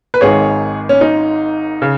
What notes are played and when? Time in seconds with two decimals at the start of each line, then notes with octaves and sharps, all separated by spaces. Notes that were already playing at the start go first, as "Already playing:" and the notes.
0.14 B4
0.21 G#1 G#2 D#3 G#4 C#5
0.89 C#4
1.01 D#4
1.82 C#3